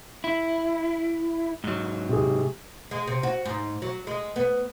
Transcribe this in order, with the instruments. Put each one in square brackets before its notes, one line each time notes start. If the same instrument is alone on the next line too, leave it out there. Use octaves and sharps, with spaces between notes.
[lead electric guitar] E4
G#2 F#3
[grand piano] C3 G#4
[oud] G#3
C3
F#4
G#2
F#3
G#3
B3